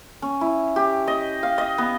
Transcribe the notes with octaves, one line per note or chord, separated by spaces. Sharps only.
C#4
E4
G4
D#5
F5
D#5
B3